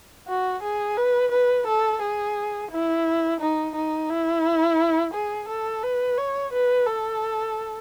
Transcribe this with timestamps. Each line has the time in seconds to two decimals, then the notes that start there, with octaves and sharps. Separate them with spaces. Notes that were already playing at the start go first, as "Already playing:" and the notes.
0.28 F#4
0.63 G#4
0.97 B4
1.32 B4
1.67 A4
2.02 G#4
2.71 E4
3.40 D#4
3.75 D#4
4.10 E4
5.14 G#4
5.48 A4
5.83 B4
6.17 C#5
6.53 B4
6.87 A4